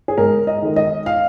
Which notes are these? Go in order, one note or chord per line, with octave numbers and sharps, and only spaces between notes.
G#4
G#2 A#4
D#5
D#3 G#3
D#5
F5